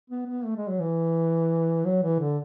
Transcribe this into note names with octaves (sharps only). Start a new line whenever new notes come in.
B3
B3
A3
G#3
F#3
E3
F#3
E3
D3